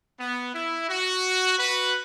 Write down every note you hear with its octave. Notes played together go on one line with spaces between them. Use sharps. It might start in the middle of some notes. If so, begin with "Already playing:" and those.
B3
E4
F#4
F#4 B4